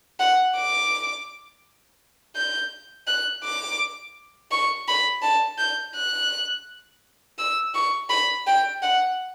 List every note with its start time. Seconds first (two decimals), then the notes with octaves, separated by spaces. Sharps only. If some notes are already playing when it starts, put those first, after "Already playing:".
0.20 F#5
0.56 D6
2.36 G6
3.07 F#6
3.43 D6
4.51 C#6
4.87 B5
5.22 A5
5.59 G6
5.95 F#6
7.38 E6
7.74 C#6
8.09 B5
8.47 G5
8.82 F#5